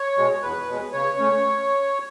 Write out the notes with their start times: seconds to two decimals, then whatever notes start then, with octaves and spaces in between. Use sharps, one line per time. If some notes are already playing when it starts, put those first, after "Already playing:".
Already playing: C#5
0.17 B2 G#3
0.42 E2 B4
0.68 B2 G#3
0.92 C#3 C#5
1.19 A3 C#4